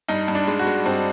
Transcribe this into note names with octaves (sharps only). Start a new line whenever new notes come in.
G2 D#4
G2
D4
G#3
F#4
G#3
G2 C4